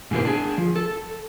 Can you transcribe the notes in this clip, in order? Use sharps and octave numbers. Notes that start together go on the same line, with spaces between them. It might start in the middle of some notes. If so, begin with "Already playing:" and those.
G#2 B2 E3 A#3 G4 C5
D4 G#4
F3
A4